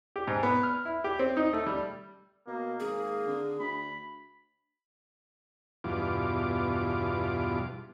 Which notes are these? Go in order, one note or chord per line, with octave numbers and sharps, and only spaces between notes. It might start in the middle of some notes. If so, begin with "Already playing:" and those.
G4
G#2
B3
F6
E4
G4
C4
D#4
A3
G3
B2 A#3
G#1 A#3 G#4
D3
D2 B5
E2 G2 B2 F4 D6